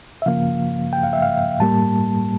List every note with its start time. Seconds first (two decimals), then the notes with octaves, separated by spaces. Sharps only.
0.22 E5
0.26 C#3 F3 A#3 F5
0.93 G5
1.03 F5
1.13 E5
1.22 F5
1.60 A2 G3 A#3 A5